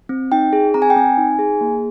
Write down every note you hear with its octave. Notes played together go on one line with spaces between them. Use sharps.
C4
D#4 G5
G#4
C4 A#5
G#5
G5
C4 G#5
D#4
G#4
A#3